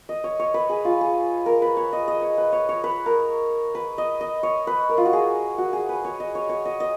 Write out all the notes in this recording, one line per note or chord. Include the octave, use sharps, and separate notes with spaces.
D#5
C#5
C#5
B4
G#4
F4
G#4
A#4
B4
C#5
D#5
D#5
C#5
B4
C#5
C#5
B4
A#4
B4
D#5
D#5
C#5
B4
A#4
F4
F#4
G#4
F#4
G#4
B4
C#5
D#5
C#5
C#5
D#5
D#5